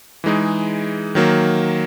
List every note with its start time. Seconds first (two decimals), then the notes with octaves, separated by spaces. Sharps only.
0.24 E3 G#3 D#4 G#4
1.15 D#3 F#3 A#3